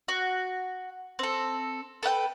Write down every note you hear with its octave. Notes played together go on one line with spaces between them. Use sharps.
F#4
C4 A4
A4 B4 F#5 G5